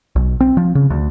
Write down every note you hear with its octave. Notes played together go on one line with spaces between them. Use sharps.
B1
C4
F3
C#3
D2